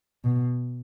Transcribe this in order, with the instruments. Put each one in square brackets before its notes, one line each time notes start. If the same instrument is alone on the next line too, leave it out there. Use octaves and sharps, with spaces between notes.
[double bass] B2